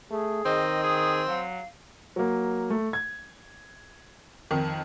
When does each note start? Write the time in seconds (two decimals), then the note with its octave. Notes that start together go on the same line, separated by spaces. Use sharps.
0.11 A3 G#4
0.45 D#3 C4 D#5
0.83 G#4 D#6
1.28 F#3 F5
2.16 F#3 A#3
2.70 A3
2.93 G#6
4.51 F2 D#3